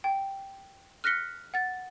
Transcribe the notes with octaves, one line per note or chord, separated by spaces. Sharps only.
G5
F6 F#6 A#6 B6 C#7 G7
F#5 A6